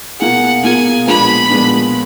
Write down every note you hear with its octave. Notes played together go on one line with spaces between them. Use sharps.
B2 A#3 F4 G#4 F#5
B2 A#3 F4 G#4 G#5
A#2 F3 G#3 B3 D4 B5
A#2 F3 G#3 B3 D4